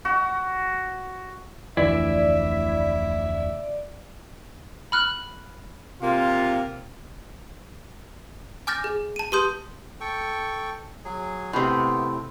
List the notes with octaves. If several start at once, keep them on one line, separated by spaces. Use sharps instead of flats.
F#4
F1 D2 E3 E4 D5 E5
B5 F6 F#6
C3 A#3 F4
G#5 D6 F6 G6 A6 A#6
G#4
A5 D#7
G4 B4 C6 D#6 G6
A4 G5 C#6
F#3 G#4
A2 C3 B3